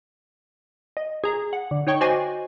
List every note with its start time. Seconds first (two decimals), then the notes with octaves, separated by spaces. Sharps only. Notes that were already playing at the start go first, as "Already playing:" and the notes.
0.97 D#5
1.24 G#4 A#5
1.53 F#5
1.71 D3
1.87 D#4 C#5 G5 C#6
2.01 F#4 C5 D#5 G#5 D6 A6